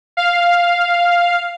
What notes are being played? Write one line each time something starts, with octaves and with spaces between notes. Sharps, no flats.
F5